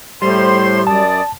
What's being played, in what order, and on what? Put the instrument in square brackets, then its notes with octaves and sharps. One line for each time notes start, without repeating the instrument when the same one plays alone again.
[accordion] A2 C6 [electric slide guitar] G3 [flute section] C5
[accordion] F#2 [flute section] D5 D#6 [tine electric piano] A5